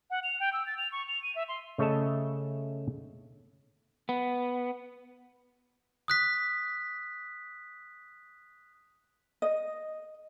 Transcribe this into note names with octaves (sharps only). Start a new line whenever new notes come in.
F#5
F7
G5
E6
A6
F7
C#6
F7
D#7
E5
C6
C#3 A3 C#5 D#5 E5 A5
B3
D#6 F#6 B6
D#5